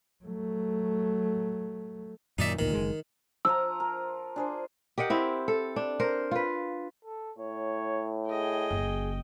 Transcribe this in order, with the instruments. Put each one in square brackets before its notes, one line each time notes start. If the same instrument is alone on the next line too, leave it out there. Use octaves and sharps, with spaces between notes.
[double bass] F#3 A3
[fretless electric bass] F#2 A#2 D#3 [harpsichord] D#4 D5 E5
[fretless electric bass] A1 D2 A#2 [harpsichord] D#3
[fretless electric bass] F#1 G#3
[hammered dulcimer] F3 F4 A#5 [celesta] E6
[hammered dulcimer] A#4
D4 G#4 C5
[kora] G4 A#4 D#5 F#5
C4 E4
A4
D4
A#4 C5
F4 B4
[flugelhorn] A4
[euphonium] A2 [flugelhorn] C#5
[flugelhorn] G#4 [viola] D#5 G5
[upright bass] F#1 E3